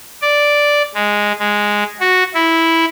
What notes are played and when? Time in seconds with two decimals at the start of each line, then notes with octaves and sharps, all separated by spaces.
0.22 D5
0.95 G#3
1.39 G#3
2.00 F#4
2.34 E4